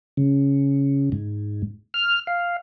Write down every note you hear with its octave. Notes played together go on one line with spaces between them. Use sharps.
C#3
G#2
F6
F5